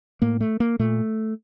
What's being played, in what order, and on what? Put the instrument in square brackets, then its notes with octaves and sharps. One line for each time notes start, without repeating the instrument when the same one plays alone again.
[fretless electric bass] A2 A#3
A3
A#3
A#2 A3